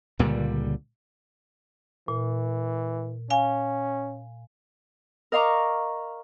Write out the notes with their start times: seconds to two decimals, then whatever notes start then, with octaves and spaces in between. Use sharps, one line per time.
0.19 C#2 A#2 D3 G3
2.08 A#2 E3
3.30 C#4 F5 G#5
5.32 A#4 D#5 F5 A#5 C#6 D6